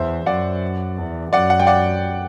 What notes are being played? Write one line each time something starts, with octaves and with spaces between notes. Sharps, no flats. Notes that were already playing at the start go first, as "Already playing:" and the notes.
Already playing: E2 C5 E5
F#2 D5 F#5
E2
F#2 D5 F#5
F#5
G5
D5 F#5